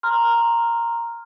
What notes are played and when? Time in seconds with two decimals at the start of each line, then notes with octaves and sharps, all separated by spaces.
0.03 A#5 C6 F6